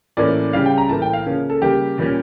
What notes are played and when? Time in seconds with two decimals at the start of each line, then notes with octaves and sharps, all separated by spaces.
0.17 A2 E3 A#3 C#4 D5
0.53 C#3 G3 C#4 F5
0.66 G5
0.78 A#5
0.89 A2 E3 A#3 A5
1.02 G5
1.13 F5
1.26 C#3 F3 A#3 C#4
1.50 A4
1.62 C#3 G3 A#3 G4
1.98 A#2 G3 A#3 C#4